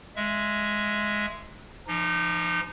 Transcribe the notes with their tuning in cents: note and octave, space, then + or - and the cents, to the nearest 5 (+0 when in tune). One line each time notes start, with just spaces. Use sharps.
G#3 +5 E5 +15
F3 -35 D#4 -20